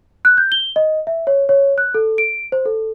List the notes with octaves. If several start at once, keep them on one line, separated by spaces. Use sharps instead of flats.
F#6
G6
G7
D#5
E5
C#5
C#5
F#6
A4
D7
C5
A4